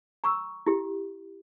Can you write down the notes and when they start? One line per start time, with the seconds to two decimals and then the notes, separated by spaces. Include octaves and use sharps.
0.24 A#5 C#6 E6
0.67 E4 G4